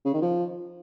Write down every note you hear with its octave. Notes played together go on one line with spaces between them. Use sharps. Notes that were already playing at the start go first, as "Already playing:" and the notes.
C#3
D#3
F3